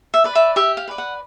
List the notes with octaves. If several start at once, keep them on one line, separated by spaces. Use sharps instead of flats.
E5
B4 D5
E5
G4 E5
F5
B4 D5
F#5